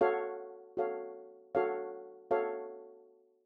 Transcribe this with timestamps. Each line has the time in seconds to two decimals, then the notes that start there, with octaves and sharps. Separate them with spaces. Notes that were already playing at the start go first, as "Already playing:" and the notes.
0.01 F#4 A4 C#5 F5
0.77 F#4 A4 C#5 F5
1.55 F#4 A4 C#5 F5
2.31 F#4 A4 C#5 F5